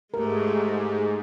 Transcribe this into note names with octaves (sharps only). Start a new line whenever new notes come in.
G#2 G#3 A3 G4 A#4